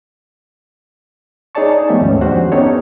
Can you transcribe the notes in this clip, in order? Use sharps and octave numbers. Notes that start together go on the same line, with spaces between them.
D#4 G#4 C#5 D5 A5 C#6
F3 A3 B3 G4 E5
D#2 G#2 C#4
F2 D4 F#4 G4 C5 F#5
B3 C#4 D#4 G4 A4 C#5